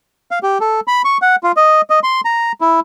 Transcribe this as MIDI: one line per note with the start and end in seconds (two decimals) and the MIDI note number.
0.31 0.39 77
0.43 0.58 67
0.60 0.80 69
0.88 1.02 83
1.05 1.18 85
1.22 1.36 78
1.43 1.52 65
1.57 1.81 75
1.90 2.00 75
2.03 2.21 84
2.25 2.52 82
2.61 2.80 64